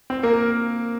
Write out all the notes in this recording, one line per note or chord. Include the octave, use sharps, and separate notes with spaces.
C4
A#3 A#4
A#4